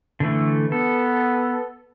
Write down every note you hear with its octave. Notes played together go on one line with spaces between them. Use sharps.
D3 E3 A3
B3 A4